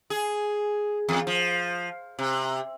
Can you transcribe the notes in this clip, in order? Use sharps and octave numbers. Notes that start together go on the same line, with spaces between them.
G#4
E2
F3
C3